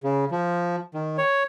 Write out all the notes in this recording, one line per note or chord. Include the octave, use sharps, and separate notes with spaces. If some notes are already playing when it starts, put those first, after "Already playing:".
C#3
F3
D#3
C#5